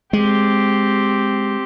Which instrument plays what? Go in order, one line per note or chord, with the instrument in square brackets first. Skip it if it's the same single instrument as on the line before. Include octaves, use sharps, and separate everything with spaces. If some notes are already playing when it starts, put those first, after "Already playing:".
[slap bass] G#3 [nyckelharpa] C4 G4